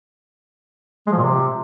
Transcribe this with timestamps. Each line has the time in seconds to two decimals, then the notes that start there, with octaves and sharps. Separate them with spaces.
1.07 G#3
1.12 F3
1.18 A#2
1.23 C3